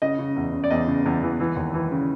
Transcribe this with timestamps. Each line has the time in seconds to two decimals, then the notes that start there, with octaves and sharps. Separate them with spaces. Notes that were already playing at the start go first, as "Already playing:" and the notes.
0.02 C#3 D#5
0.19 C#3
0.36 E2
0.54 C#3
0.64 D5
0.70 E2 D#5
0.88 C#3
1.06 E2
1.23 E3
1.40 E3
1.56 D#2
1.74 E3
1.92 C#3